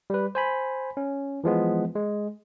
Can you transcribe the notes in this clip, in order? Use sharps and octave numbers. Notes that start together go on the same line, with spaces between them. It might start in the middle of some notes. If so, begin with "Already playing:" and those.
G3 B4
C5 G#5 B5
C#4
E3 F3 G#3 B3
G#3